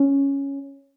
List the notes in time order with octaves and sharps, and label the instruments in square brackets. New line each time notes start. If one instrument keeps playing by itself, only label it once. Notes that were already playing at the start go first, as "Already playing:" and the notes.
Already playing: [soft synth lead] C#4